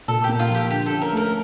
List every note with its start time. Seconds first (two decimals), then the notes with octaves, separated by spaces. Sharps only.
0.08 A#2 A4
0.24 G4
0.29 A#3
0.39 F4
0.50 F3
0.55 G4
0.71 D3 G4
0.86 A4
0.92 C#4
1.02 A#4
1.12 A3
1.17 A#4